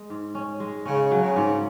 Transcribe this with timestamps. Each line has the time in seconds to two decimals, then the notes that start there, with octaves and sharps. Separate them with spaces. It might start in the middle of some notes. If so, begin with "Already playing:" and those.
Already playing: G#3
0.10 G#2
0.35 C#4
0.60 G#3
0.85 C#3 C#4
1.11 F#3
1.23 C#3
1.36 G#2